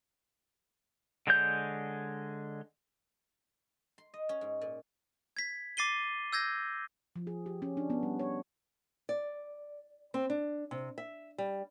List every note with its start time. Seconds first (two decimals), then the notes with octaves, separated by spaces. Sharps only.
1.27 D3 G#3 C#5 G6
3.98 C6
4.14 D#5
4.29 C#4
4.41 G#2
4.61 A#2
5.37 G#6 B6
5.77 D6 A6 C7 D#7 G7
6.33 E6 G6 G#6 A#6
7.16 F3
7.27 G#4
7.46 G4
7.62 C#4
7.77 D4
7.90 B3
8.03 G3
8.19 C#5
9.09 D5
10.14 C4
10.30 D4
10.71 C3
10.98 E5
11.38 G3